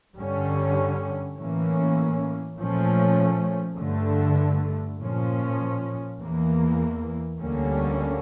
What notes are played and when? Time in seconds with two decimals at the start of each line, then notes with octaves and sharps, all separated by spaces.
0.16 G2 D3 G3 C#4
1.37 A2 E3 A#3 C#4
2.58 A#2 F3 A3 C#4
3.78 G2 D3 A3
4.99 A#2 F3 C#4
6.20 E2 E3 A#3
7.40 D2 D3 G3 A#3 C#4